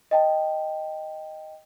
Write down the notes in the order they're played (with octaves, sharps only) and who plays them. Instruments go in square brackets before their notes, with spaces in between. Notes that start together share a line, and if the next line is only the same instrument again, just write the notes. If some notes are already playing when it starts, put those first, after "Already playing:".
[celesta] D#5 G5 A5